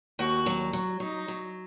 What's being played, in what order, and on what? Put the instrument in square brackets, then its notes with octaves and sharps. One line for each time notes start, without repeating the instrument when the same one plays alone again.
[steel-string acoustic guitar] D#2 [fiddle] F#4
[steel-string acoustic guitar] F#3
F#3
[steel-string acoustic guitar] F#3 [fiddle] D#4
[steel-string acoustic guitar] F#3